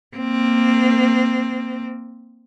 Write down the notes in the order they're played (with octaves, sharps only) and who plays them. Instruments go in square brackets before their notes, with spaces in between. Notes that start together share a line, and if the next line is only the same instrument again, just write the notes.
[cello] A#3 C4